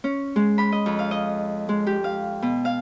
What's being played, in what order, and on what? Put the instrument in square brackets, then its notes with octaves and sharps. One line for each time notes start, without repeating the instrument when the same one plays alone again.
[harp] C#4
G#3
B5
D#5
F2
F5
D#5
G#3
G4
F5
B2
F5